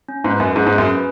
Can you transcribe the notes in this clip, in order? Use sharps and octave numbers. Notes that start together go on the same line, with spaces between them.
C#4
G#2 B4
F#2 F#5
G#2 G#4
G#2
C#4
F#2
B4